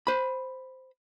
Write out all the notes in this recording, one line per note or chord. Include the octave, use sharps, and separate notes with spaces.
C5 B5